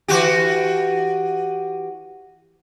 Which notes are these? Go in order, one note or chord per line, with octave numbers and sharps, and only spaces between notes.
E3 F#4 G4